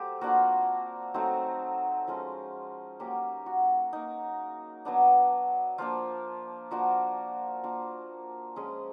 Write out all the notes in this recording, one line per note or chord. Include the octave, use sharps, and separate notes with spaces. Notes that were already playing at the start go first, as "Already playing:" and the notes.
Already playing: F#3 A3 C4 G4
A#3 D4 F4 F#4
F#3 A3 C4 D#4 F#4
F3 G#3 C#4 F4
F#3 A#3 C#4 G4
F#4
A#3 D#4
F#3 B3 D4
F3 A#3 D4 F4
F3 A#3 D4 F4 F#4
A#3 D4 F4
F3 G#3 C#4 G#4